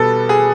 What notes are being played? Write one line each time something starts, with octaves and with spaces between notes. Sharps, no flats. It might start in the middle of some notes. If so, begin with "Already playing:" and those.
Already playing: B2 G3 B3 A4
G#4